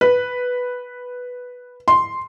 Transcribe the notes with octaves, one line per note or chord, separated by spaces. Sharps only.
B4
C6